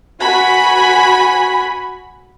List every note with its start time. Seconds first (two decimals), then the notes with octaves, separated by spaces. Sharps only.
0.21 F#4 G#5 B5